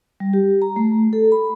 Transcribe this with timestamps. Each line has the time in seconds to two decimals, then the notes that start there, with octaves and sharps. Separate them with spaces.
0.20 G3
0.33 G4
0.62 A#5
0.76 A3
1.13 A4
1.32 B5